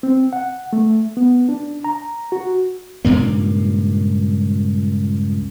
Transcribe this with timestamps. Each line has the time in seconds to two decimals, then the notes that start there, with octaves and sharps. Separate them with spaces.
0.03 C4
0.33 F#5
0.73 A3
1.17 B3
1.49 D4
1.84 A#5
2.32 F#4
3.05 C#2 G2 A#2 A#3